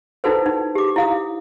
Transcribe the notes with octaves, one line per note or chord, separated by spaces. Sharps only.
D#4 E4 F#4 A4 B4 C5
D#4
G4 D6
E4 F5 D#6